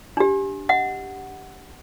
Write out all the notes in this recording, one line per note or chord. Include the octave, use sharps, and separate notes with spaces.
D4 G4
D#5 F#5